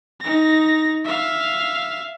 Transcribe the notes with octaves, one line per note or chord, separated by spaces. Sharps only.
D#4 A#6
E5 F5